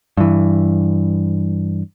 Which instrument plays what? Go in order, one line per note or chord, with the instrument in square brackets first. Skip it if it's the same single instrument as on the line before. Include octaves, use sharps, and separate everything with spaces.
[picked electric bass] G2 E3